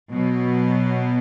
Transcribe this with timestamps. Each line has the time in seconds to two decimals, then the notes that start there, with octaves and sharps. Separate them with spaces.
0.11 B2 F#3 B3